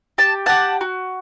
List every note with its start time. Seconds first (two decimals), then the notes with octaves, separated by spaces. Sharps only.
0.18 G4 A5
0.46 G4 F#5 A5
0.81 F#4